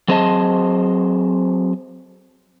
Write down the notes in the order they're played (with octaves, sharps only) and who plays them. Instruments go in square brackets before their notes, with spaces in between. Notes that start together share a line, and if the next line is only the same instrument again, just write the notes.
[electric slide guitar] F#3 C4 G#4 C5 D#5 A5